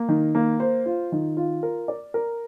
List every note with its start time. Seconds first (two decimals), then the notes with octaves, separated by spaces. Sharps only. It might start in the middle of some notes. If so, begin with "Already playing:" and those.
Already playing: A#3
0.08 D#3
0.35 A#3
0.60 C5
0.86 F4
1.12 D#3
1.37 F4
1.63 A#4
1.88 D5
2.14 A#4